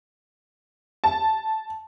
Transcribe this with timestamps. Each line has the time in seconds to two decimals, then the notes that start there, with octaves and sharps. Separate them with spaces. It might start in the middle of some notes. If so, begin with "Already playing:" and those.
1.04 A5